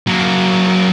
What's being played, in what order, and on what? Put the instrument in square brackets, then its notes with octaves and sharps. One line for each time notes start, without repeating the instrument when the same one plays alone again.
[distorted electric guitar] F#3 A#3